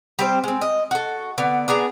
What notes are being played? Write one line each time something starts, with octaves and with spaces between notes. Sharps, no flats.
G3 C4 C5
G#3 C4
D#5
F#4 A4
D3 B3
B3 D4 G#4 A#5